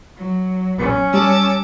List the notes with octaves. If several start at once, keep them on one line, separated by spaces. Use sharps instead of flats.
F#3
C#4
G3 A5 D6 E6